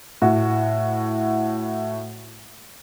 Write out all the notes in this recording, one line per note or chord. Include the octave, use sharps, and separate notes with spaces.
A2 F#4